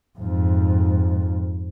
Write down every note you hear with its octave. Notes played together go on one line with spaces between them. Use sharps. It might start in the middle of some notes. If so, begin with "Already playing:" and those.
F2 G#2